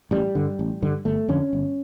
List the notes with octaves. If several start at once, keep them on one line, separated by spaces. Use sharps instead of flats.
A1 G3
G2 D3
A1
G2 D3
G1 A3
F2 D3 C#4
G1